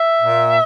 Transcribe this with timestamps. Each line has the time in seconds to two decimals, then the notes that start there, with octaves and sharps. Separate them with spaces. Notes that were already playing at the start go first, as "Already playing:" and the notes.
Already playing: E5
0.21 A#2